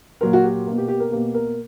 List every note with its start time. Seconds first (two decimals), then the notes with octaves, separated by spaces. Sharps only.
0.21 A#2 F#3 A#3 A#4
0.33 F#4
0.43 G4
0.66 B2 A#3
0.78 G4
0.88 G4
1.00 A#4
1.11 B2 A#3 G4
1.34 A#4